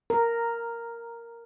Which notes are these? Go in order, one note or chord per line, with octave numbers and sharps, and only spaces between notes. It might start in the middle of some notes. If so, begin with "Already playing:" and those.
A#4